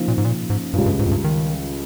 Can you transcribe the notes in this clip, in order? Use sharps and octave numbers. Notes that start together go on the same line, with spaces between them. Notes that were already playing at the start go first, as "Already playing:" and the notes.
Already playing: C#3 F3 A#3 D#4
A#2
G#2
A#2
G#2
C#2 G2 C#3 G3 C#4 F4
G2
G#2
F2
G2
D#3